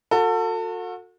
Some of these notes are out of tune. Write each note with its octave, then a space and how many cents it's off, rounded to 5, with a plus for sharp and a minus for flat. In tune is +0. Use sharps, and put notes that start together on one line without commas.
F#4 -35 A4 +30